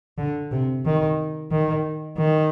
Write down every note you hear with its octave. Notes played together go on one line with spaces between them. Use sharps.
D3
C3
D#3
D#3
D#3